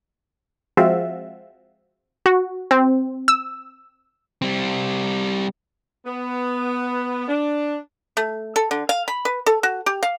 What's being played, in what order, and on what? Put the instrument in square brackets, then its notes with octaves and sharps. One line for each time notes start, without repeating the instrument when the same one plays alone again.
[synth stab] F3 G#3 C4 F4 F#4 E5
[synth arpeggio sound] F#4
C4
E6
[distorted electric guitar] G3 C4
[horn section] B3
D4
[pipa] A3
A4
D3
F5
B5
B4
A4
F#4
G4
F5